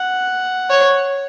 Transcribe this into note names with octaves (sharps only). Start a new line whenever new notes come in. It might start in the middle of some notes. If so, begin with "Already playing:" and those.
Already playing: F#5
C#5